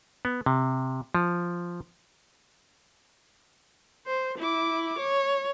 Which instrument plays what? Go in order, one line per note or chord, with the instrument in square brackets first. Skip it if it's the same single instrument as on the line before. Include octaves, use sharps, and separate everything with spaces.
[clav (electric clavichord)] B3
C3
F3
[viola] C5
E4 D6
C#5